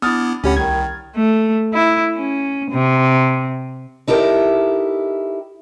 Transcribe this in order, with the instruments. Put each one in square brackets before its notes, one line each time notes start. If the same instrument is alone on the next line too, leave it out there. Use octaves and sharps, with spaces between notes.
[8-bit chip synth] B3 E4 [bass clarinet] D4 [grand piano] D#6 F6 A6
[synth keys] D2 G4 B5 [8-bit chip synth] C#4 C#5 F#5
[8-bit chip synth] C2 [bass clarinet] D#3 [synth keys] G#6
[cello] A3
E4
C#4
C3
[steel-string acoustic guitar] D#4 E4 G4 A4 A#4